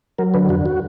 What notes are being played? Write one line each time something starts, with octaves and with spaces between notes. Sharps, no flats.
F#3 A#4
D3 B4
F2 F#4
F#4